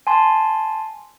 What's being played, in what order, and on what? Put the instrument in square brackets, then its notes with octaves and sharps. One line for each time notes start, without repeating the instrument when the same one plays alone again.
[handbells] G#5 A5 C6